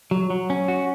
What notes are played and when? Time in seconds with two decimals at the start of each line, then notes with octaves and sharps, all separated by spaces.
0.11 F#3
0.30 F#3
0.50 C#4
0.68 F#4